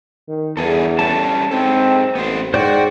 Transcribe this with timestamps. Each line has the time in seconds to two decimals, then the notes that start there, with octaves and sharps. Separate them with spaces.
0.28 D#3
0.57 E2 G2 G#4 A4
0.99 G3 C#4 A4 A5
1.51 G#2 C4 A4
2.15 A1 B3 C5
2.54 G#2 F#4 C5 D5 G5